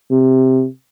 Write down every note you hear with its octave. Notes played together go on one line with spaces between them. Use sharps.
C3